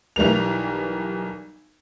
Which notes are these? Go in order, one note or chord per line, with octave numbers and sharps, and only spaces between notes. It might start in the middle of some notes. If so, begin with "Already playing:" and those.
B1 E3 G3 A#4 F7